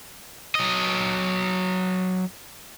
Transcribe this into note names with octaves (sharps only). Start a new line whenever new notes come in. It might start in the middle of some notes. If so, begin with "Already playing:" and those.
F#3 D#5